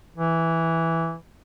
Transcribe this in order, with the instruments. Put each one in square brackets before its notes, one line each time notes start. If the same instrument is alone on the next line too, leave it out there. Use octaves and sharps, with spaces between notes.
[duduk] E3